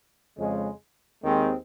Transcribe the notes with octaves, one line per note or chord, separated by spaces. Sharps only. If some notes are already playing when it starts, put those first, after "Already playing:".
F2 C#3 G#3
D#2 D#3 G#3 C4